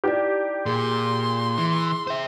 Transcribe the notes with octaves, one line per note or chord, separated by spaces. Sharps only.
D#4 E4 G4 D5
A#2 G#4 C6
E3
C5 E5